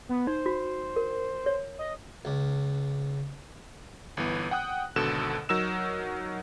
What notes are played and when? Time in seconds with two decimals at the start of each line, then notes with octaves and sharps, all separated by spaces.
0.09 B3
0.27 D#4 C5
0.46 F#4
0.96 A#4
1.46 C#5
1.78 D#5
2.25 C#2
4.17 G1 E3 B3
4.51 F#5 G5 D#6 F#6
4.96 G#1 B2 D3 A4 E7
5.49 F#3 D#4 A#4 E6 E7